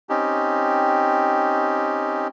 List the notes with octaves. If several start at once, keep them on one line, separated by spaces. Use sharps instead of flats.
C4 C#4 D#4 G4